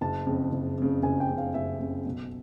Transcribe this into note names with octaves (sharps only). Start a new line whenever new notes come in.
F#1 A5
F2 C#3
F#1
F2 C#3
F#1 G#5
G5
F2 C#3
F5
F#1 E5
F2 C#3
B1